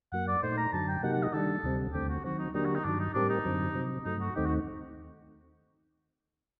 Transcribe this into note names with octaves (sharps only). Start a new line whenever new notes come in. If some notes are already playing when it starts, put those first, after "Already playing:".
F#2 F#3 A#3 F#5
D5
A#2 A3 D#4 C5
A#5
F#2 D3 F#3 A5
G5
C3 F#3 A#3 D#4 G4 F#5
F#5
D#5
D#3 G3 D4 A4
D2 C3 G3 C4
D#2 D3 A3 C4 G4
F#4
D#3 F#3 C4 F#4
D#4
D3 F#3 A#3 D4 D#4 G4
F#4
D#4
G2 D#3 F#3 D4
D#4
A2 G3 C4 D4 G4 A#4
D#4
F#2 D3 F#3 C4
C3 F#3 C4
G2 F#3 A3 D#4
F#4
D#2 D#3 A3 C4 D#4 G4
F#4